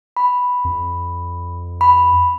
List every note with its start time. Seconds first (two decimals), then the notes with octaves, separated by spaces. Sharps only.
0.17 B5
0.65 F2
1.81 B5